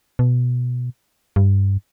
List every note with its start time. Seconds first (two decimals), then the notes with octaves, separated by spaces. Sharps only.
0.19 B2
1.36 G2